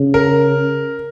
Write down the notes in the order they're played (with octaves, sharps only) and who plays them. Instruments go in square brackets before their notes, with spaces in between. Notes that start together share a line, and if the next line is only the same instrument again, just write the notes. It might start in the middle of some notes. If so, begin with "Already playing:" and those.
Already playing: [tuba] C#3
[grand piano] A#4